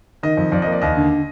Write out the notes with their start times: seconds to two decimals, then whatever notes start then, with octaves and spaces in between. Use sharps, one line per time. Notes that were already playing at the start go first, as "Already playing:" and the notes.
0.23 D#3 D#5
0.37 F2
0.52 F2 D5
0.62 A#3 D#5
0.72 D5
0.82 D#2 D#5
0.96 D3